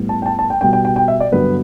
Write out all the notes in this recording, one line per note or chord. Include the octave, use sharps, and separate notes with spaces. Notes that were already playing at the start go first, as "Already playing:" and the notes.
Already playing: A2 G3 B3
A5
G5
A5
A5
G5
B2 G3 B3 G5
G5
G5
G5
E5
D5
G2 D3 F#3 B3 B4